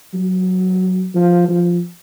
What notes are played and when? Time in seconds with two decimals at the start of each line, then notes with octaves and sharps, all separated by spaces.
0.14 F#3
1.15 F3
1.49 F3